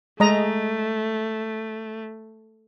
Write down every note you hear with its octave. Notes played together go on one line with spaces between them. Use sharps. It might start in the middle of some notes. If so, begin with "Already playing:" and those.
G#3 A3 D#5 A#5